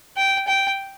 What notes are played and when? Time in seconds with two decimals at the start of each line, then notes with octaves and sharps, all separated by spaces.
0.17 G5
0.48 G5